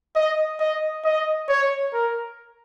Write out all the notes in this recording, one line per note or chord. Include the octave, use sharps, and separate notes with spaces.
D#5
D#5
D#5
C#5
A#4